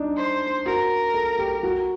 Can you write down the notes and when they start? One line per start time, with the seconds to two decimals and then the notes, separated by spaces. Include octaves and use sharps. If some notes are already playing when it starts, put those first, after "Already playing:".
Already playing: D4 D#4
0.17 C5
0.66 F#4 A#4
1.14 A4
1.39 G4
1.63 F#4